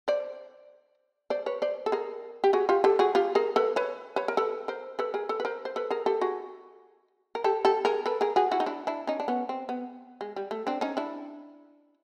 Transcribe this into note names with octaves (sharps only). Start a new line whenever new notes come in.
C5 D5
C5 D5
B4 C#5
C5 D5
A4
G#4 A#4
G4
F#4 G#4
F4 G4
G4 A4
F#4 G#4
F4 G4
G#4 A#4
A4 B4
B4 C#5
B4 C#5
A#4
A4 B4
A#4 C5
A4 B4
G#4 A#4
A4 B4
B4
A#4 C5
C5
A4 B4
G#4 A#4
G4 A4
F#4 G#4
A#4
G4 A4
G4 A4
G#4 A#4
A4 B4
G#4 A#4
F#4 G#4
E4 F#4
D#4
D4 E4
D4 E4
C#4 D#4
D4
B3 C#4
C4
B3
G#3
G3
A3
C4 D4
C#4 D#4
D4 E4